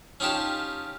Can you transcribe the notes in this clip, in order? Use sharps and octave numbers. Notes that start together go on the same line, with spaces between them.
C#4 D#4 F4 G4 A5